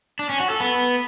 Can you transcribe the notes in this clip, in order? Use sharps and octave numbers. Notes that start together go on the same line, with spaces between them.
D4
C#4
F#4
A4
B3